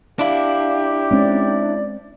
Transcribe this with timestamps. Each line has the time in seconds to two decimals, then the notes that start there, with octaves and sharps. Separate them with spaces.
0.19 D4 E4 G4 F5
1.11 G#3 C4 C#4 D5